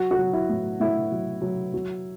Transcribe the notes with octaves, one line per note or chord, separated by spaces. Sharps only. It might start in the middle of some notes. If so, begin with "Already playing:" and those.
Already playing: F#3 F#4
F#4
F#3
E4
A2
A2 E4
F#3
F#3
F#3